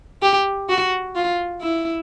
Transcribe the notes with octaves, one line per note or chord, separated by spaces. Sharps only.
G4
F#4
F4
E4